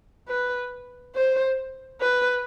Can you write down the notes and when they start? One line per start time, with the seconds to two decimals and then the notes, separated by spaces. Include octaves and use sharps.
0.28 B4
1.15 C5
2.01 B4